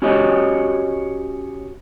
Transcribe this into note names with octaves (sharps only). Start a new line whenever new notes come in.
C#4 F#4 G4 C#5 D#5